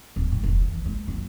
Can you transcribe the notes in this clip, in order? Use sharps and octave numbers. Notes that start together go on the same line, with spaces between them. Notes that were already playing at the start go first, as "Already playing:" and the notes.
D1
A2
F1
G2
E3
G#3
F#1